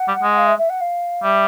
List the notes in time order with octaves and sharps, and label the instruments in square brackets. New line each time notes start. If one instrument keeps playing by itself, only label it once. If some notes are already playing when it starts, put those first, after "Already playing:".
Already playing: [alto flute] F#5
[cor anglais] G3
G#3
[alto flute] F5
E5
E5
F#5
F5
[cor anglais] G3 [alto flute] E5